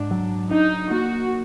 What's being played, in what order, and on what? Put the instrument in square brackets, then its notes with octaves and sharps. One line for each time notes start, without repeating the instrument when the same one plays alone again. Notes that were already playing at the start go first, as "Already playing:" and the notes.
Already playing: [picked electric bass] G#2 [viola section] D4
[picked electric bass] F#3
[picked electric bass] D4 [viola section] D#4
[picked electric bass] A#3 [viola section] F#4